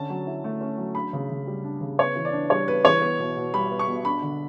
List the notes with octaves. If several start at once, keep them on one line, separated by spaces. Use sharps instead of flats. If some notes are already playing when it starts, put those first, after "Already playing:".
Already playing: D3 C#4 A5
F#3
E4
A3
C#4
F#3
D4 B5
C#3
C#3
G3
D4
C#3
B3 C#5
E3
D5
D4
G3 C#5
B3 B4
E3 C#5
B3
B2
B2
G3 B5
B3
C#6
B2
D4 B5
D3